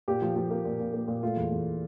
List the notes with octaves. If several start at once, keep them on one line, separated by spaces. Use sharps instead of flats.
A#2 G4
F3
F3
A#3
A#2
A#2
A#3
A#2
A3 F4
E2
E2